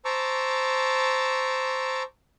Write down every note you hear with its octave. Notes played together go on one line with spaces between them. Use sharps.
C5 A5 A#5 C#6 D6 E6